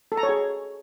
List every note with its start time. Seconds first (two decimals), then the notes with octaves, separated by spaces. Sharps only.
0.12 A4
0.17 A#5
0.23 C#5
0.29 G#4